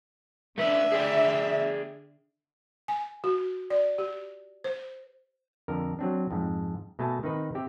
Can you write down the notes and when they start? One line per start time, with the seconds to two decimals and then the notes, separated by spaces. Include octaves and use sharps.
0.58 D3 A3 B4 E5
0.92 G#4 D5 G5
2.88 G#5
3.24 F#4
3.70 D5
3.98 G4
4.64 C5
5.68 F2 D3 A#4
5.99 F#3 C4 D4
6.31 F2 G#2
6.99 B2 A3 G#5 A5
7.23 D#3 C4 D#4 B4
7.55 C4 G4 E5